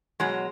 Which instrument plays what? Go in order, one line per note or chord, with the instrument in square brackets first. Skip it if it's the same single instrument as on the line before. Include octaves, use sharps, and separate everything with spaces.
[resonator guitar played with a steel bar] B2 F#3 G#3